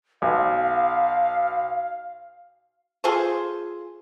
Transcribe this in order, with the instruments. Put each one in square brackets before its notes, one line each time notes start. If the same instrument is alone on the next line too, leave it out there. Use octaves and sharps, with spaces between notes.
[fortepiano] B1 [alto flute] F5
[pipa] F4 G#4 A4 C5